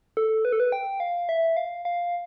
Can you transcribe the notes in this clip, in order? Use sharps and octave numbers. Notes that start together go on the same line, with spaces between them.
A4
B4
A4
B4
G5
F5
E5
F5
F5